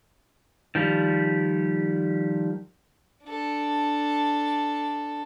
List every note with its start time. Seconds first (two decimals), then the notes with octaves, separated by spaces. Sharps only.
0.75 D#3 F3 G3
3.25 D4 A4